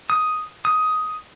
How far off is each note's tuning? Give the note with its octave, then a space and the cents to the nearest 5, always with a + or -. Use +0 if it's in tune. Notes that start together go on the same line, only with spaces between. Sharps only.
D#6 +5
D#6 +10